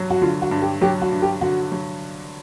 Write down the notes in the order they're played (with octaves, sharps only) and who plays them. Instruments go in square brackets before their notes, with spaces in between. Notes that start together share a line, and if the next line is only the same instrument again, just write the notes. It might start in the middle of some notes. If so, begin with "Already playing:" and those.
Already playing: [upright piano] G2 F#3
[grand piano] F#4
[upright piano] D3 [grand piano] F4
[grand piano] F#4
[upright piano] G2
[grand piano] G4
[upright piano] F#3 [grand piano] G4
[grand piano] F#4
[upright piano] G2
[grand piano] G4
[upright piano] D3 [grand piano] F#4
[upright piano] F#3